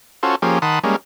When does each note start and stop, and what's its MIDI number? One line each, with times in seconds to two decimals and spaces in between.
0.23 0.36 61
0.23 0.36 65
0.23 0.36 66
0.23 0.36 69
0.23 0.36 72
0.42 0.59 53
0.42 0.59 58
0.42 0.59 61
0.42 0.59 67
0.42 0.59 68
0.62 0.79 51
0.62 0.79 78
0.62 0.79 81
0.62 0.79 83
0.62 0.79 84
0.62 0.79 87
0.84 0.96 55
0.84 0.96 56
0.84 0.96 58
0.84 0.96 61